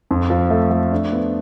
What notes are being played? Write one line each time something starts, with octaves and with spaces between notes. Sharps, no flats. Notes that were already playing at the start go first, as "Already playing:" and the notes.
F2
F3
A3
A3
D4
B3